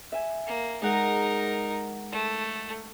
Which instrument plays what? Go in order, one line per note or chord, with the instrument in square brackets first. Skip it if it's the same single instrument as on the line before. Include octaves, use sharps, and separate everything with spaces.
[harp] E5 G#5
[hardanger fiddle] A#3
[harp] G#3 F#5 [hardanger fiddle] D#4 A#4
[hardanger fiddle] A3